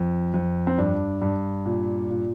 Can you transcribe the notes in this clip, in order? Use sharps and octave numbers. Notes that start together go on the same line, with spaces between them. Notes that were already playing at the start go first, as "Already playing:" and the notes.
Already playing: F2
F2
C4
G2 D4
G2
A#2
A#2